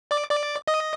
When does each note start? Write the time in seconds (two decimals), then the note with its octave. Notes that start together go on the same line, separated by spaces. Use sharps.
0.11 D5 D6
0.30 D5 D6
0.67 D#5 D#6